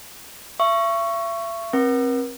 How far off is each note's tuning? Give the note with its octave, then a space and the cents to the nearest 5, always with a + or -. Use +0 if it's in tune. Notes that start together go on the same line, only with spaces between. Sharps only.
E5 +40 C#6 +0
C4 +25 A#4 +45